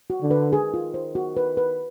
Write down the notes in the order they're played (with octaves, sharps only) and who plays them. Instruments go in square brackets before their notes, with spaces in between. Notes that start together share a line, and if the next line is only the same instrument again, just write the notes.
[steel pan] F#4
[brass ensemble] D3
[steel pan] B4
[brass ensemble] D#3 [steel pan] G#4
[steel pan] F4
C5
F#4
B4
B4